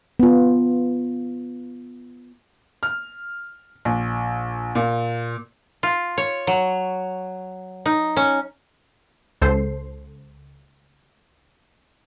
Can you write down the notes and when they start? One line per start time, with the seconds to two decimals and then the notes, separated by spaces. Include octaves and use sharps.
0.20 B3 F4
2.83 F6
3.85 A#1
4.75 A#2
5.83 F4
6.18 C#5
6.47 F#3
7.86 D#4
8.17 C#4
9.42 C#2 A4 C5 C7